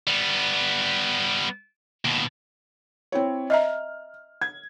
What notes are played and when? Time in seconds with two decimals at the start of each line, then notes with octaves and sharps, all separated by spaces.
0.07 G3 B3
2.05 D#2 B2
3.12 C4 E4 C#5
3.50 D#5 E5 A#5 F6
4.41 G#6